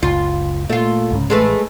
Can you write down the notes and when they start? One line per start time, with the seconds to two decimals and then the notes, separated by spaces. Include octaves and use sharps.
0.03 F#1 C#2 F4
0.69 A#2 A3 F4
1.10 C2 G#2 C#3
1.30 A1 G#3 A3 B4